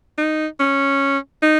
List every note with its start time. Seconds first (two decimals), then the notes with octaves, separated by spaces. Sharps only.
0.18 D#4
0.60 C#4
1.42 D#4